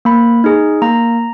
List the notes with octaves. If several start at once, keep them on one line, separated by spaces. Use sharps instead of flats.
A#3 B5
D#4 G#4
A#3 A#5